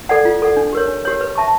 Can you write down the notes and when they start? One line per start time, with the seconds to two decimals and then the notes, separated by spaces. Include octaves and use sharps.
0.09 A4 D5 F#5
0.25 F4
0.42 A4 D5 F#5
0.57 D4
0.73 G4 A#4 C#5
0.88 D4
1.05 G4 A#4 C#5
1.21 B4
1.35 E5 A5 C#6